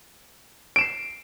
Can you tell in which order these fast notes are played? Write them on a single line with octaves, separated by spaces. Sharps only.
D7 E7 C7